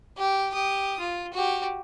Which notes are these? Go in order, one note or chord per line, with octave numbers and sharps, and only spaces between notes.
G4
G4 D#6
F4
F#4 G4